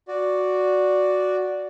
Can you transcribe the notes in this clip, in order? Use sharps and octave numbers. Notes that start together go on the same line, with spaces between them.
F#4 D5